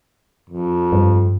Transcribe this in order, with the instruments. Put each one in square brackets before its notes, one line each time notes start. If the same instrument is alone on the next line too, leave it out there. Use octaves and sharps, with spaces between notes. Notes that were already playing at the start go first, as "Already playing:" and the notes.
[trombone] F2
[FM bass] G2